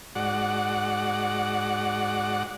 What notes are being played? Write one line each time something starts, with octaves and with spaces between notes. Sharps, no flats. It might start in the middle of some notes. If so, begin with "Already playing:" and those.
G#2 F#4 D5 F#5